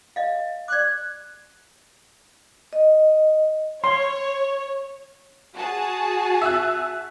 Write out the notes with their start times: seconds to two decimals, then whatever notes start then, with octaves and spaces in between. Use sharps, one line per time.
0.16 D#5 F5
0.68 D5 D6 F#6
2.73 D#5
3.84 C#5 C6
5.54 F#4 G#4 A5
6.42 E5 F#6